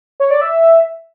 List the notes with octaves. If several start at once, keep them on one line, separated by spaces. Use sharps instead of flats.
C#5
D5
E5